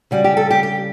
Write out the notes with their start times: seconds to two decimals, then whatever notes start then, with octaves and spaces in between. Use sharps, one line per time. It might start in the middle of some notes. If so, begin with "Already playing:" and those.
0.11 C#3 G3 F#4
0.24 G4
0.37 A4
0.50 G4
0.63 G4